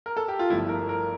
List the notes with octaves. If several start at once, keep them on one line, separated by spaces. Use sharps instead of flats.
A#4
A4
G4
F4
G1 G2 F3 A3 E4
A#4
A#4